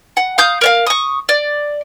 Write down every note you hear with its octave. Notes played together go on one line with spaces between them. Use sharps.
F#5
F5 D#6 G6
A#4 C#5 F5
C#6 D#6
D5